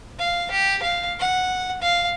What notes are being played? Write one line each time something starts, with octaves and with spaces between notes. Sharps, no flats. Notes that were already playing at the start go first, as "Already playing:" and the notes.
F5
G4
F5
F#5
F5